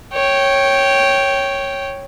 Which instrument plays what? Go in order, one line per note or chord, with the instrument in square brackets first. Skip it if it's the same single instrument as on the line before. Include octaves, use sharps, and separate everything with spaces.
[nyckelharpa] C#5 G5